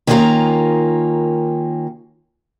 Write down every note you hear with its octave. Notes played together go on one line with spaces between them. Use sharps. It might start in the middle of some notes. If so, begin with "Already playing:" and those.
D#3 G#3 A#3 C#4 F4 A#5